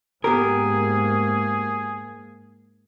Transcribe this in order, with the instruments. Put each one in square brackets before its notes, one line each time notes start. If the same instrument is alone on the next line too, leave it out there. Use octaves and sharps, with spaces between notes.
[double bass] G#2 A#3 [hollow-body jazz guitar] B3 G4 A#4 [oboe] G#4